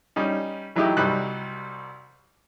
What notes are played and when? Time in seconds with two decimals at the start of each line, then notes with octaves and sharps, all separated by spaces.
0.16 G3 C#4 D#4
0.76 E3 F#3 A3 D#4 E4 G4
0.97 C2 F#3 G3 D#4 B5 F#6